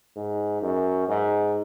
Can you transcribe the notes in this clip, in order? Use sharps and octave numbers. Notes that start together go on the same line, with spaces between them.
G#2
F#2
G#2